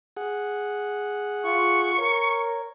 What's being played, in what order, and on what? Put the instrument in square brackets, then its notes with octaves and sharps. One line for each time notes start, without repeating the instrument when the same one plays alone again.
[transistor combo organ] G#4 F#5
[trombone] F4 [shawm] C#6
[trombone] A#4 [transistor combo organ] C#5